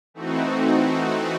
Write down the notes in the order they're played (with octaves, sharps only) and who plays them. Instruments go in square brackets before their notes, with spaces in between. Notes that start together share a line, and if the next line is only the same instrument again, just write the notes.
[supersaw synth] E3 A3 C4 D#4 F#4